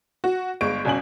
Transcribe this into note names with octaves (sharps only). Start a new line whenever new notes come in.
F#4
G1 G#3 C#6 D7
G1 B2 C#4 G#5 F#7